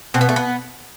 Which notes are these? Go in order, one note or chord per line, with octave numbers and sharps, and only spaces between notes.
B2 C4
B3
A3
B3